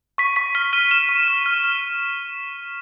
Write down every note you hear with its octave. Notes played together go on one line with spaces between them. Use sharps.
C#6 B6
C#6 B6
F6 B6
F6 D#7
F6 E7
C#6
F6
F6
F6